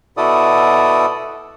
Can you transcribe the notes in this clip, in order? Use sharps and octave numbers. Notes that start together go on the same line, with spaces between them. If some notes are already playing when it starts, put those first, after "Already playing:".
B2 E4 F#4 A4 D5 D#6